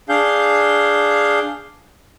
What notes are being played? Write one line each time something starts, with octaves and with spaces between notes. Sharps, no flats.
D4 G#4 F5 G6